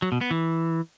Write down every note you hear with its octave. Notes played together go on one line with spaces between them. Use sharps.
F#3
B2
B3
E3